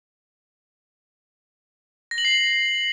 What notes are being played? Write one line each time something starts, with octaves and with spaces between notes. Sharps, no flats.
A#6
F#7
C7